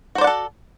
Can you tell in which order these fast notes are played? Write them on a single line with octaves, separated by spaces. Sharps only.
F#4 C5 D5 F#5 A4